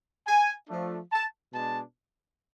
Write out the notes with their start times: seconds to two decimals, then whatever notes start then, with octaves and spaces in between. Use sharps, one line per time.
0.27 G#5
0.69 F3 A3 D4
1.12 A5
1.53 B2 G#3 D4 A5